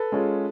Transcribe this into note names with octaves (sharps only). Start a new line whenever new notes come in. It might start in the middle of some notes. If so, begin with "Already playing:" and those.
Already playing: A4 B4
G#3 C#4 F4